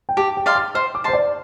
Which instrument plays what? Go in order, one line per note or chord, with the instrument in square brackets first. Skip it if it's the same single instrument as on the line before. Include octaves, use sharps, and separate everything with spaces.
[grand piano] G5
[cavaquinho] G4 [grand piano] A5
[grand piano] G5
[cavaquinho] D5 F5 C6
[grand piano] D6
[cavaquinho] C5 [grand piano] F6
[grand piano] D6
[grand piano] C5 [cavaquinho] A5 C6
[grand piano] D5